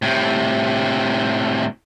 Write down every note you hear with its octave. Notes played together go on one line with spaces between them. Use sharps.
A2 C3